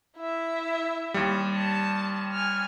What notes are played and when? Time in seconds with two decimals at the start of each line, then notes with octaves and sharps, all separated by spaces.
0.18 E4 E5
1.14 D#2 G3
1.55 A5
2.33 G#5 F6